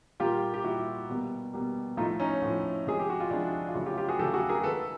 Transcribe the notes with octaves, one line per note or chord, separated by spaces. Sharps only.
A#2 G3 A#3 F4 G4
G4
A#2 G3 A#3 E4 F#4
B2 G3 A#3
B2 G3 A#3
A2 F3 A3 D#4 F4
C#4 D#4
A2 F3 A3
C3 F3 G#3 G#4
G4
F#4
F4
C3 F3 G#3 D4 E4
F4
C#3 F#3 A3 E4 F#4
F4 G4
F4 G4
F#4 G#4
C#3 F#3 A3 G4 A4
F#4 G#4
G#4 A#4
D#3 G#3 A4 B4